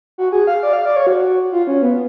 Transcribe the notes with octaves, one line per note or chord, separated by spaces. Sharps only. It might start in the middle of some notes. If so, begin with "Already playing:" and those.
F#4
G#4
F5
D5
F5
D5
C#5
F#4
F4
C#4
B3